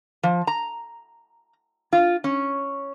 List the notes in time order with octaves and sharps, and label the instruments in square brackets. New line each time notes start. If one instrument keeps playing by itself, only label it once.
[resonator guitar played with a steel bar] F3
A#5
F4
C#4